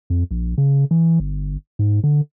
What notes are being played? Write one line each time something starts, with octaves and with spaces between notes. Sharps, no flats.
F2
A#1
C#3
E3
G1
G#2
D3